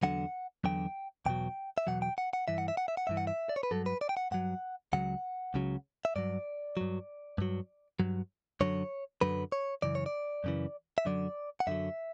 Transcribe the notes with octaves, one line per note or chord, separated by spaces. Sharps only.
E2 D3 F#3 F#5
E2 D3 F#3 G5
E2 B2 F#3 G5
E5
E2 B2 F#3 F#5
G5
F#5
F#5
G2 E3 E5
F#5
E5
F#5
E5
F#5
G2 E3 E5
F#5
E5
D5
C#5
B4
G2 F#3 A4
B4
D5
G5
F#5
G2 F#3 F#5
C#2 C#3 F#3 F#5
C#2 C#3 F#3
E5
G2 F#3 D5
G2 F#3
G2 F#3
G2 F#3
F#2 D3 F#3 C#5
F#2 D3 F#3 B4
C#5
F#2 C#3 E3 D5
C#5
D5
F#2 C#3 E3
E5
F#2 D3 F#3 D5
F#5
F#2 D3 F#3 E5